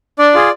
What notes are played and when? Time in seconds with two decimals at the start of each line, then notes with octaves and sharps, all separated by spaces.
0.19 D4 D5
0.34 F4 G#4